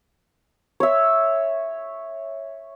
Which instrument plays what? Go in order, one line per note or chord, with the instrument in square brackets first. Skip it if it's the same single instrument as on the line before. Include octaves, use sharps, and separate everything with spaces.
[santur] C#5 E5